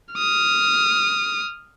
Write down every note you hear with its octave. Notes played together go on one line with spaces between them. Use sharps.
D#6 F6